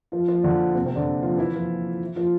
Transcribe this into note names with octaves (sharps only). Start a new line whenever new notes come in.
F3 F4
F3 F4
D3 D4
C3 C4
C3 C4
D3 D4
F3 F4
E3 E4
F3 F4
F3 F4